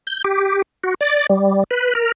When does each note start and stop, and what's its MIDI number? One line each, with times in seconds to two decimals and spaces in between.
0.07 0.22 91
0.24 0.62 67
0.84 0.94 66
1.01 1.26 74
1.30 1.64 55
1.71 1.93 71
1.95 2.12 70